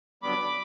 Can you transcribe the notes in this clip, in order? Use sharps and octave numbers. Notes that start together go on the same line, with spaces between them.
F#2 D3 G3 B3 B5 D6